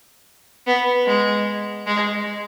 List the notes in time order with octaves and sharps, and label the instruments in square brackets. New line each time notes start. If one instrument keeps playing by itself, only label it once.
[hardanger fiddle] B3
G#3
G#3